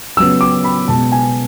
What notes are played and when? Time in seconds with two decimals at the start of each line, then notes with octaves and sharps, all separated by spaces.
0.17 C#3 F#3 B3 E6
0.41 D6
0.64 B5
0.88 B2 G#3 B3 A5
1.12 G#5